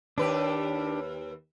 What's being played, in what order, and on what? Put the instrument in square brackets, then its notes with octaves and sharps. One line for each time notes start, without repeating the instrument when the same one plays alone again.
[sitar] D#2 B4 [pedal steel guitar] D4 G4